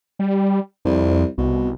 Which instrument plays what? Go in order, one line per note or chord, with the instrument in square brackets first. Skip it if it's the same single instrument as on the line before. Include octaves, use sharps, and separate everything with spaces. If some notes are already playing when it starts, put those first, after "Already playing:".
[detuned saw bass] G3
[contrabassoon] C2 [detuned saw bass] F2
[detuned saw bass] C2 [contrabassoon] B2